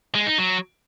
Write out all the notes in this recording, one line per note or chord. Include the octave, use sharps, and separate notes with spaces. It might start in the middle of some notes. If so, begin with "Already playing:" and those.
G#3
D#4
F#3